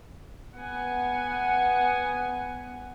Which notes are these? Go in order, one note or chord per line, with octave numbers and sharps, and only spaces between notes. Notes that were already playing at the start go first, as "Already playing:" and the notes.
B3 F#5 G#5